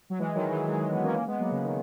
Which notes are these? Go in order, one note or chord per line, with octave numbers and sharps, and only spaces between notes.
F#3
E3 G#3
D#3 F#3
E3 G#3
E3 G#3
G#3 B3
A#3 C#4
A#3 C#4
G#3 B3
F#3 A#3
C#3
D#3